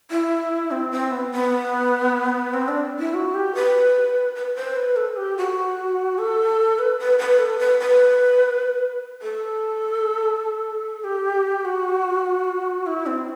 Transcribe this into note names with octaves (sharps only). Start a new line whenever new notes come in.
E4
C4
C4
B3
B3
C4
D4
E4
F#4
G4
B4
B4
C5
B4
A4
G4
F#4
A4
B4
B4
B4
A4
B4
B4
A4
G4
F#4
E4
C4